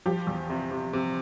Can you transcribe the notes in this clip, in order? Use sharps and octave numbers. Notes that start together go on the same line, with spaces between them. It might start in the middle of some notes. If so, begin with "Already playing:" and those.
F3 G4
E2
C3
C3
C3